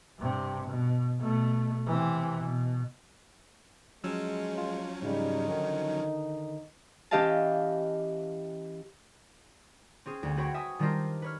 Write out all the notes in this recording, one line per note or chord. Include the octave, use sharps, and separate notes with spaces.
G2 C3
B2
B2 A3
C3 E3
B2
F3 F#3 G#3 C#4 E6
F4
G#2 C#3 G3 D#4
D3 D#3
E3 C#4 G4 D#5 F5 A5
C4 C#4 G#4
D2
C4 F#4 B4 C#5 F#5 G5
E5 G#5 D#6
D#3 G3 D4 F4 A#4 C5
B4 C#5 F6